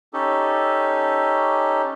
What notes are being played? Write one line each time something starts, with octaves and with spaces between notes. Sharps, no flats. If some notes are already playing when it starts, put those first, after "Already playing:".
C#4 D#4 G4 A4